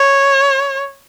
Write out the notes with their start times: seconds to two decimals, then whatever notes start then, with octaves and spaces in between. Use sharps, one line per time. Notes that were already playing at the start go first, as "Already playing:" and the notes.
Already playing: C#5